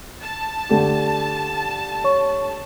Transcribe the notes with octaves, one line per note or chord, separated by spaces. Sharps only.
A5
D3 A3 G4
C#5 C#6